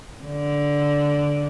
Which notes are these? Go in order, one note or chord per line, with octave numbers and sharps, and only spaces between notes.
D3